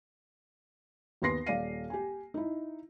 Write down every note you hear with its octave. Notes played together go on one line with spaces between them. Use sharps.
D#2 B3 C6 A#6 C7
D#1 D5 F5 C7 D#7
G4 G#5
D#4 E4